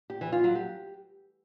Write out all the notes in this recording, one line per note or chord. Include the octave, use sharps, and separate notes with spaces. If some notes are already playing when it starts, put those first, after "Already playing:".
G4
E3
F4
F#3
G4